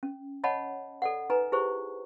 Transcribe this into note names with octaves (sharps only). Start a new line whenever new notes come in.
C#4
C#5 D#5 F#5 A5 B5
A4 D5 F#5
D#4 B4 G#5 A#5
E4 G4 G#4 C5 C#6